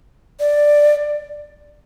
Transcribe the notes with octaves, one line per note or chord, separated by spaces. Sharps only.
D5